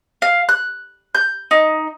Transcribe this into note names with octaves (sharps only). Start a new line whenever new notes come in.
F5
F#6
G6
D#4